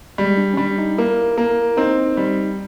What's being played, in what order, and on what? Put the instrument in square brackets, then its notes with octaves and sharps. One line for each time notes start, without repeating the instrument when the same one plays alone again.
[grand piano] G3 [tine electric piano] G#3
[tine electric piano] D4
C#4
[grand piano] G3 [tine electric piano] D4
[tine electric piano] D#4
[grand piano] A#3 [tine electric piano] E4
[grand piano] A#3
[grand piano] C4 [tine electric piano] D#4
[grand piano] G3